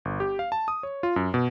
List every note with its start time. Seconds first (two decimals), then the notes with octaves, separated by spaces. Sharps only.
0.05 G1
0.20 G4
0.39 F5
0.52 A5
0.68 D#6
0.83 C#5
1.03 F4
1.16 F#2
1.34 B2